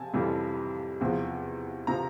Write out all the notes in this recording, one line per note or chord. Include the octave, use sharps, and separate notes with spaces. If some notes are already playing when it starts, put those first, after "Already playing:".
Already playing: C3 G#5 A5
F2 C3 E3 G3
E2 C3 F3
C3 F3 A#5